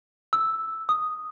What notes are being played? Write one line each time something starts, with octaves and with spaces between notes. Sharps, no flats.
E6
D#6